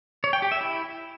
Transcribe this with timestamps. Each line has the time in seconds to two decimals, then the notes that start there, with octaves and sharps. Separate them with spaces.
0.24 C#5
0.33 G5
0.42 G4
0.52 E5
0.61 E4